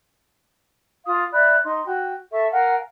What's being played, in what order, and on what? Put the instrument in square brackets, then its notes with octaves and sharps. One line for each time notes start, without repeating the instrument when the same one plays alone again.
[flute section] F4 F5 D#6
D5 E5 B5 F#6
D#4 C6
F#4 G5
A4 E5 C#6
A#4 F5 F#5 G#5